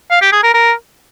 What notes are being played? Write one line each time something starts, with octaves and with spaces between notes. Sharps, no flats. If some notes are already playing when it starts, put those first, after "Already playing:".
F5
G4
G#4
A#4
A#4